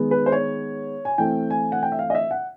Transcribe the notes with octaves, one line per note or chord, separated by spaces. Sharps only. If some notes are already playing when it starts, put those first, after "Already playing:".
Already playing: D#3 G#3 B3
B4
C5
C#5
G#5
E3 A3 C4 G5
G#5
F#5
G5
E5
F5
D#5
E5
F#5